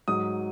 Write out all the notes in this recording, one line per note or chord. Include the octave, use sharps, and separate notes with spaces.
G#2 F#3 D#6